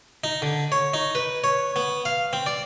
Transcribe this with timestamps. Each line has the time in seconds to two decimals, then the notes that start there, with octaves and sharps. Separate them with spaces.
0.24 D#4
0.42 D3
0.72 C#5
0.94 D#4
1.15 B4
1.44 C#5
1.76 B3
2.05 F5
2.33 C4
2.46 D5